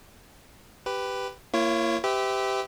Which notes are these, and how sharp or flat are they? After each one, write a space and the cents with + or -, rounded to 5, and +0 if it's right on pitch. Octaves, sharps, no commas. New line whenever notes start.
G4 +0 B4 +10
A#3 +0 E4 +45 C#5 -10
G4 +0 B4 +45 E5 -20